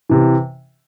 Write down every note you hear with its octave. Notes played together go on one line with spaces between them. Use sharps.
C3 E3